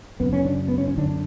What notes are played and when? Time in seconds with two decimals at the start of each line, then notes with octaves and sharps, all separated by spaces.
0.20 F#2 C#3 B3
0.33 C#4
0.45 D4
0.68 B3
0.78 C#4
0.88 C#4
0.97 F#2 D3 D4